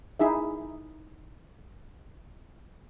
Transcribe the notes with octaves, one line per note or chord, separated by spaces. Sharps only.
D#4 E4 G#4 E5